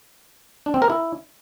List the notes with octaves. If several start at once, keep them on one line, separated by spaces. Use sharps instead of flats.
D4
C4
A#4
E4